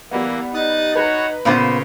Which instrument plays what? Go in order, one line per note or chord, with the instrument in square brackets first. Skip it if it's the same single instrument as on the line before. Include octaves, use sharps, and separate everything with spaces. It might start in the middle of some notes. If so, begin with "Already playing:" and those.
[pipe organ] E3 A#3 [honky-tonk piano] G3 B3
[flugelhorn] D#4 [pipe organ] D#6 F#6 A6
[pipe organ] F#4 C#5 [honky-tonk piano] B4 A#5
[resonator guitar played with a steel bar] A#2 B3 C5 [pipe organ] C#3